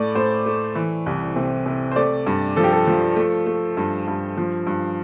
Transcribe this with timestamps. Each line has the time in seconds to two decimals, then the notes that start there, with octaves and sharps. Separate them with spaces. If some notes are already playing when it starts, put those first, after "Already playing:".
Already playing: A2 A3 D5
0.15 A2 C5
0.46 A3
0.75 E3
1.06 C2
1.36 C3
1.66 C3
1.92 C5
1.96 A3 D5
2.26 G2
2.56 F3 A4
2.64 G4
2.72 A4
2.87 F3
3.16 A3
3.46 A3
3.77 G2
4.08 G2
4.37 F3
4.67 G2